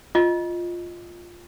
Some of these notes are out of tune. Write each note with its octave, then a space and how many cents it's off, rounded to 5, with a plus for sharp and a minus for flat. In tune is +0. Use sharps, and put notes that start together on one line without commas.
F4 +0 D#5 +0